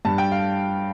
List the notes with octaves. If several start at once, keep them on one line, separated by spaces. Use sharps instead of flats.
G2 A5
G5
F5